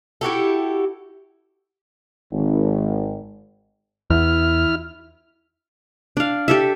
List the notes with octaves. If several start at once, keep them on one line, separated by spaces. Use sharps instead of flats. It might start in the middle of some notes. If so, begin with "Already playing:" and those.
E4 F#4 G4 A4
G#1
E2 E4 F6
D4 F5
G4 A4 E5